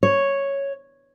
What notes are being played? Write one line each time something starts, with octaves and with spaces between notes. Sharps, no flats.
C#5